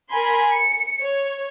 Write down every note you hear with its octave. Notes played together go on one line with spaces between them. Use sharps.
A#4 G#5 B5 C6
C#7
C#5